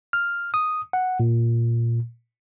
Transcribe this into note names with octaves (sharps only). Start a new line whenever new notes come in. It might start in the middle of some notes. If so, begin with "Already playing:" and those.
F6
D#6
F#5
A#2